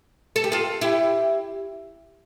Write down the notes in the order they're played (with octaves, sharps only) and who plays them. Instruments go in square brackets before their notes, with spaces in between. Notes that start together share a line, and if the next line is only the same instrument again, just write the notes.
[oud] A4
G4
F4 A4
E4 G4